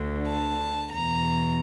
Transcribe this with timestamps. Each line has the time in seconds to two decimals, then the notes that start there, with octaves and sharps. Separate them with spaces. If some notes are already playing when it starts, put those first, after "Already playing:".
Already playing: D2 D3
0.28 A5
0.94 E2 B2 A#5